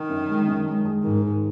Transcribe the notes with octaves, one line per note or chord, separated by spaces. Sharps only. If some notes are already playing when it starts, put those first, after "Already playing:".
Already playing: D#3
F#2
G#3
F#2
G#3
G#3
G#2 D#3
D#3